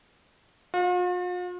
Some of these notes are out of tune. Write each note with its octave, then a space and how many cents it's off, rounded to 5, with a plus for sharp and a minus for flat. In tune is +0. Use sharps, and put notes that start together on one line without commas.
F4 +45